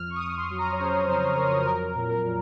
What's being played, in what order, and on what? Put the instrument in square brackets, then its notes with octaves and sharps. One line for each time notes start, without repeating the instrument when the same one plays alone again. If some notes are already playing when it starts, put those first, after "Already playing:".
Already playing: [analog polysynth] F2 F6
C#6
D#6
F2
C6
F#3
A#5
C#5
C#3 C5
F2 C5
F2 A#4
F#3 A#4
A#2
A#4
A#2